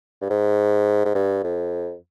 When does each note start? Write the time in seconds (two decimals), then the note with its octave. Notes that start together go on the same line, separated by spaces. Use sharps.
0.21 G2
0.30 G#2
1.05 G#2
1.15 G2
1.44 F2